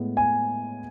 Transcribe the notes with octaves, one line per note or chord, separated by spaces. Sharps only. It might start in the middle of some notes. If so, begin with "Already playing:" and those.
Already playing: A2 G#3 B3
G#5